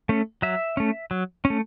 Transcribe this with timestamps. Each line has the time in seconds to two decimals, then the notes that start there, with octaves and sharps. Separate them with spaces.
0.09 A3 C#4
0.42 F#3 E5
0.77 A3 C#4
1.11 F#3
1.45 C#4
1.50 A3